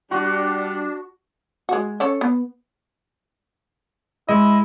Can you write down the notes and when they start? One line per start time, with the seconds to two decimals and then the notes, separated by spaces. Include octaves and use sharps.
0.11 G3 D4 F#4
1.69 G#3 F#4
2.00 C#4 A4 C#5
2.21 B3
4.29 G#3 E4 D#5